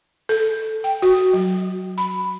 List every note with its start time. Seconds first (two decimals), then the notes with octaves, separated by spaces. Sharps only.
0.29 A4
0.84 G5
1.02 F#4
1.33 F#3
1.98 B5